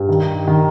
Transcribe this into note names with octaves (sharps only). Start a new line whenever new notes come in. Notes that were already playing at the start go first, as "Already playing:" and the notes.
Already playing: G2
D#3
D#3